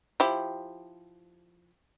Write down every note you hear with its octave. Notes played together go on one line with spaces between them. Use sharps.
F3 E4 G4